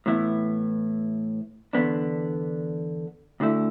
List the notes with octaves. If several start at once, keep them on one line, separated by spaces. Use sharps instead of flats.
A2 E3 B3 E4
E2 D3 B3 D4
D2 D3 A3 E4